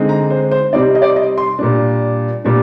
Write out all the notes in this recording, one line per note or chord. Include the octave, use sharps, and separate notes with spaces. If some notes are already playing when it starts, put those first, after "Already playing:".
Already playing: D3 G#3 C4 D#4
A#5
C5
C5
C3 G3 C4 D#4 D5
D#5
D5
D#5
C6
A#2 G3 D4
A#2 G3 D4